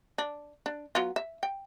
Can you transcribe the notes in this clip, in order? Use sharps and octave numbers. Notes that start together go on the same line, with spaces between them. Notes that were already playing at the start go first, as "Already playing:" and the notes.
D4
D4
F#3 B3 F4
E5
G5